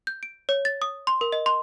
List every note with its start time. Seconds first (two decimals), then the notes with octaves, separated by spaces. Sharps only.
0.07 G6
0.23 D7
0.49 C#5
0.65 A6
0.82 D#6
1.07 C6
1.21 A#4
1.32 D#5
1.46 C6